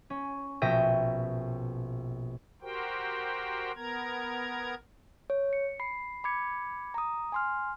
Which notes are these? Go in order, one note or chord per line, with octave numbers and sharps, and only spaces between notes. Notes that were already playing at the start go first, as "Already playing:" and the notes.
C#4
A#1 B2 E5 G5 A#6 D#7
F#4 G4 A#4 C5 G5
B3 A#4 A#5 G#6
C#5
C#7
B5 C7
B5 D6 G#6 C#7
A#5 D#6
G#5 C6 F6